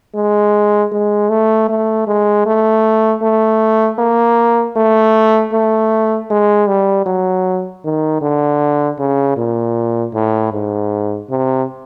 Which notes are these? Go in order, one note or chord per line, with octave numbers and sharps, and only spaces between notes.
G#3
G#3
A3
A3
G#3
A3
A3
A#3
A3
A3
G#3
G3
F#3
D#3
D3
C#3
A#2
A2
G#2
C3